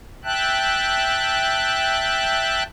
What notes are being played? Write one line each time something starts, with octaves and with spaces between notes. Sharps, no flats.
E5 G5 A5 F#6